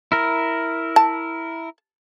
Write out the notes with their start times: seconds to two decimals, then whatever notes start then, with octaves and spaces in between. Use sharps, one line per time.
0.12 E4 A#4
0.96 A5